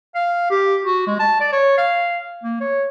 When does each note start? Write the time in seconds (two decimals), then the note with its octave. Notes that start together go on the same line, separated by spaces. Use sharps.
0.15 F5
0.51 G4
0.85 F#4
1.07 G#3
1.19 A5
1.40 D5
1.52 C#5
1.78 F5
2.43 A#3
2.60 C#5